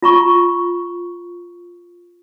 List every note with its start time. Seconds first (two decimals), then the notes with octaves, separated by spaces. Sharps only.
0.03 F4 A#5 C#6